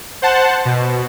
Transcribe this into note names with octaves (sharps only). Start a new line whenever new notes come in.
C5 F#5 A5
B2